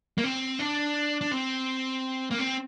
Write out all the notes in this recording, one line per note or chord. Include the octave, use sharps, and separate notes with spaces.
A#3
C4
D4
D4
C4
A#3
C4